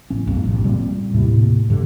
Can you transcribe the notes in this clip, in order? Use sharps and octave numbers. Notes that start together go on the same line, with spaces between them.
A1 C#4
B1 F#2 A2
A1
A#2 G3 C4
D#2 A2 C3
G2 D3